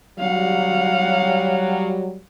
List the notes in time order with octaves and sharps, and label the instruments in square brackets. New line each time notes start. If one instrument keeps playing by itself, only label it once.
[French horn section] F#3 G3 [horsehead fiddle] F5 F#5